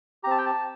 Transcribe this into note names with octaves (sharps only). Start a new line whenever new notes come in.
C4 G4 A5 A#5
G5
A5